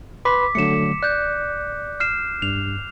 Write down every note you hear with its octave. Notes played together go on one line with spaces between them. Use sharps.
B4 B5 C6 D6 B6
D3 F#3 A3 C#7 E7
D5 F#6 G6
F6 C7 E7
G2 F7